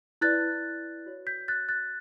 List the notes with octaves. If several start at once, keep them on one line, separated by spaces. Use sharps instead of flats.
E4 B4 D5 F#6 A6
F#4 C#5
G6 B6
F#6 A6
F#6 A6